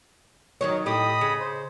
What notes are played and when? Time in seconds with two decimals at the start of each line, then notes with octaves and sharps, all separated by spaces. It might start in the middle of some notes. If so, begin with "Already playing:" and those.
0.61 D#3 F#3 C#5
0.86 A2 G4 D#5 B5 D#6
1.21 C#3
1.40 C5